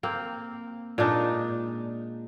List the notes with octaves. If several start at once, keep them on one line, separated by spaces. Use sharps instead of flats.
A#3 C4
A#2 G#3 D4 D#4